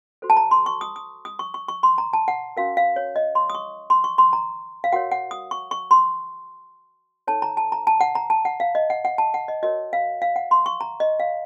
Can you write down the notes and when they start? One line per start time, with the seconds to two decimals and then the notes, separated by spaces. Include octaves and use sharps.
0.22 F#4 A4 C5
0.30 A5
0.37 A#5
0.51 C6
0.66 C#6
0.81 D#6
0.96 D#6
1.25 D#6
1.39 C#6
1.54 C#6
1.68 C#6
1.83 C6
1.98 A#5
2.13 A5
2.28 F#5
2.57 C#4 F#4 A#4 F5
2.77 F5
2.96 C#5
3.16 D#5
3.35 C6
3.50 D#6
3.55 C#6
3.90 C6
4.04 C#6
4.18 C6
4.33 A#5
4.84 F5
4.93 F#4 A#4 C#5 F#5
5.11 F#5
5.31 D#6
5.51 C#6
5.71 C#6
5.91 C6
7.27 D#4 A4 C#5 A5
7.42 A#5
7.57 A5
7.72 A#5
7.87 A5
8.01 F#5
8.15 A#5
8.30 A5
8.45 F#5
8.60 F5
8.75 D#5
8.90 F#5
9.05 F#5
9.18 A5
9.34 F#5
9.48 D#5
9.63 F#4 A#4 C#5 D#5
9.93 F5
10.22 F5
10.36 F#5
10.51 C6
10.66 C#6
10.81 A#5
11.00 D#5
11.20 F5